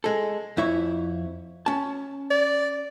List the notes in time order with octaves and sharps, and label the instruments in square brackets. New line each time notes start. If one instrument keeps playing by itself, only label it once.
[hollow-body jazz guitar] G#3 A4
F2 E4 C#5
C#4 A5
[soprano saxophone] D5